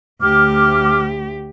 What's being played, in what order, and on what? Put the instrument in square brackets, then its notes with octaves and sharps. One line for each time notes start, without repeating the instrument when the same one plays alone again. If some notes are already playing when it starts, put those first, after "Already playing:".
[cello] D2 G4 [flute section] D6 F6